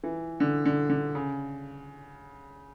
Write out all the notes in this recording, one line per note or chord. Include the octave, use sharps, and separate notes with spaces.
E3
D3
D3
D3
C#3